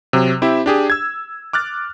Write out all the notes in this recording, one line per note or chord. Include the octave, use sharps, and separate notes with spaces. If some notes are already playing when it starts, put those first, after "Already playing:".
C3 F#3
C4 E4 G4 E5
D4 G4 G#4
E6 G#6
D6 F6 F#6 A6